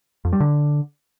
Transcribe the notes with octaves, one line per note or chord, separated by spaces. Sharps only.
F2
G3
D3